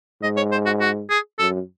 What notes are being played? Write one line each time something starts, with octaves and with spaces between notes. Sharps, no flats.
G#2 D#5
C#5
C5
F#4
F#4
G#4
F#2 A4